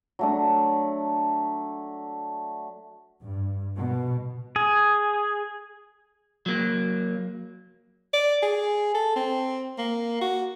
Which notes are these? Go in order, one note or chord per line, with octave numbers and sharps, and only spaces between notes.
F#3 A3 D4
G2
B2
G#4
F#3 A#3
D5
G#4
A4
C4
A#3
F#4